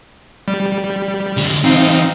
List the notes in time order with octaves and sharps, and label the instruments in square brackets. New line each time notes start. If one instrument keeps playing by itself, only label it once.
[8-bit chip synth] G3
[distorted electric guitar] D3 G#3
[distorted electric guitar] E3 C5 [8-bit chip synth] C4 D#4 F5